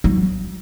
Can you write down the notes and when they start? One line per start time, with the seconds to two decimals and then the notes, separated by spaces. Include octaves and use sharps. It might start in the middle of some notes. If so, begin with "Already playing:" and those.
0.04 F#3